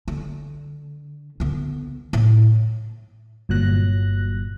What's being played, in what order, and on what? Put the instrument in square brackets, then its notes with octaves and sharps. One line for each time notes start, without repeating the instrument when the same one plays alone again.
[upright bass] D3
D3 B3
A2
[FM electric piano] G1 A#2 F#3 F#6 A#6